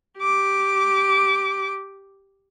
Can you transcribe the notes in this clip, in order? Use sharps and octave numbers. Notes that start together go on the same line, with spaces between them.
G4 D6